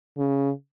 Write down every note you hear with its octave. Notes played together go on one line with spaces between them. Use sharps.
C#3